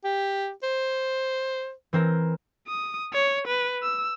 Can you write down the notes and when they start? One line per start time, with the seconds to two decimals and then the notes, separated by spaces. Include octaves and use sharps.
0.04 G4
0.63 C5
1.93 E3 C4 A#4
2.68 D#6
3.13 C#5
3.47 B4
3.83 E6